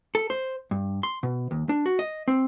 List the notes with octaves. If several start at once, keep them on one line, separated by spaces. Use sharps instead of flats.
A4
C5
G2
C6
B2
D#2
D4
F#4
D#5
C4